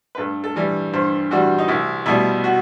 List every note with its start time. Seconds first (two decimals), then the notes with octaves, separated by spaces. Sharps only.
0.15 B4
0.18 G2 A4
0.44 A4
0.56 E3 G3
0.93 G2 C5
1.31 E3 G3 F#4
1.58 D#4
1.68 C2 E4
2.06 B2 G3 E4
2.44 F#4